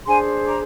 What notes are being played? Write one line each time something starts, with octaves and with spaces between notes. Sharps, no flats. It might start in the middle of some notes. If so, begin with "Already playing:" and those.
D4 G#4 C5 G#5 C6
A#5 D6